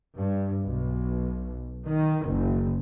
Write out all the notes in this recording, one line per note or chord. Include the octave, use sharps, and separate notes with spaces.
G2
B1
D#3
F#1